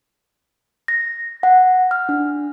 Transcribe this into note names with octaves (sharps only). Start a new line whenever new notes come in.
A#6
F#5
F6
D4